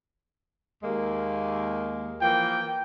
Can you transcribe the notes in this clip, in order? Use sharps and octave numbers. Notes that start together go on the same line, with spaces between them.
D#2 G#3 A#3
E3 F3 A#3 G5